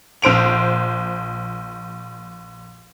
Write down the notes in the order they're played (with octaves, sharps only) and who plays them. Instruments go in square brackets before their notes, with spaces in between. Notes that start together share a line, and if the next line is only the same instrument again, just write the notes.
[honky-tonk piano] A#1 C5 D7 F7